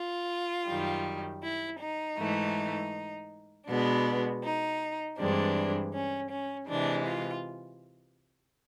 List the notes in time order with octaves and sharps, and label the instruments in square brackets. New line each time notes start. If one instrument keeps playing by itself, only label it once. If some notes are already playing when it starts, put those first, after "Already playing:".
Already playing: [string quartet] F4
F#2 D#3 G3
E4
D#4
G#2 E3 A3
B2 G#3 B3 D4
D#4
G2 E3 G#3 C4 D4
C#4
C#4
C3 E3 G#3 D4
F4